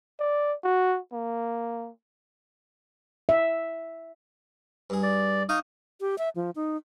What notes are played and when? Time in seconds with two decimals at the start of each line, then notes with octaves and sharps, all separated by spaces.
0.20 D5
0.64 F#4
1.12 A#3
3.29 E5
4.90 G2 G#4
5.03 D5
5.49 D#4 F5 A#5 C#6 D#6
6.01 G4
6.18 E5
6.36 F3
6.56 D#4